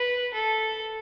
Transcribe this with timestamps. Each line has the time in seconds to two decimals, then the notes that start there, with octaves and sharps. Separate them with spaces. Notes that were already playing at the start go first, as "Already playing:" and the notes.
Already playing: B4
0.34 A4